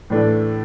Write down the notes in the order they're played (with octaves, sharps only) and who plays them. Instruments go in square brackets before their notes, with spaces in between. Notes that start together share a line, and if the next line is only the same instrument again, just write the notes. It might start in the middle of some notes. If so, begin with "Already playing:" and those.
[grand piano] A2 E3 A3 D4